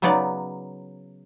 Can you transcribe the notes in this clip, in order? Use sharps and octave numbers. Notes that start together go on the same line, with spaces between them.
C#3 F#3 B3 D#4 D5